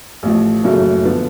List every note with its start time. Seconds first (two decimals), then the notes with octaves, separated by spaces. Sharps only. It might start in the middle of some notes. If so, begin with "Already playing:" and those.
0.23 A1 A2 F3
0.64 F#1 F#2 C#3 F#3 A3
1.05 D3 F3 B3